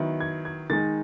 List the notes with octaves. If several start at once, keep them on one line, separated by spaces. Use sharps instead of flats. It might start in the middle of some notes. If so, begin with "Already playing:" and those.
Already playing: D#3 F#3 B3 E4
G#6
G#6
D#3 G#3 D#4 A6